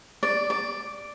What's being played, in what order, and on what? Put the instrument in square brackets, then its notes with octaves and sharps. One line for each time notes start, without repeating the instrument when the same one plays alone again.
[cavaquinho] D5
D5